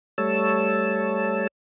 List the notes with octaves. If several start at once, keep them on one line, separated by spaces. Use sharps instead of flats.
G3 A3 C#5 A5 E6